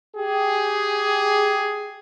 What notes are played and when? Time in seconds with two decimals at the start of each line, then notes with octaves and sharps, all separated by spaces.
0.16 G4 G#4